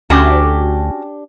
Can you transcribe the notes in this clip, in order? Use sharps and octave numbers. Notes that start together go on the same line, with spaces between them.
D2 C#4 D4 F#4 G4 A5